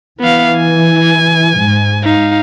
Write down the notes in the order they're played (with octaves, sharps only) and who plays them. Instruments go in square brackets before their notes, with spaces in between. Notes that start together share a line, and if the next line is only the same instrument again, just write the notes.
[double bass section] E3 [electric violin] B3 F5
[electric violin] G#5
[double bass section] G#2
[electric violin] D#4 F5